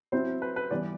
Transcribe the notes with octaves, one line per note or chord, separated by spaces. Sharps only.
F#3 C4 E4 C5
B4
B4
E3 G3 B3 D5